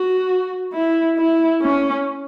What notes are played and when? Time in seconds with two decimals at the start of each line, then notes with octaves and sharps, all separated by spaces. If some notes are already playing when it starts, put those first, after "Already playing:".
Already playing: F#4
0.73 E4
1.18 E4
1.62 C#4